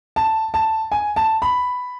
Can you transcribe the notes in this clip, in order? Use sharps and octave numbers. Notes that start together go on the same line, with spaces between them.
A5
A5
G#5
A5
B5